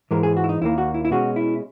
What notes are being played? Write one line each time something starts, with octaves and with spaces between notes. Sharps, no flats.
G#2 E3 G#3 A#4
G#4
F#4
E4
D#4
D#2 D#3 A#3 E4
F#4
E4
E4
B2 G#3 C#4 F#4
E4